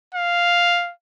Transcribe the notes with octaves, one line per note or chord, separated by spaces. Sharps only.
F5